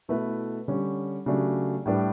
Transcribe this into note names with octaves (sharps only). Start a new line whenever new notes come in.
B2 A3 E4 B4
D3 G3 C#4
C#3 F#3 A3 D4 G4
A2 G3 D4 G4 B4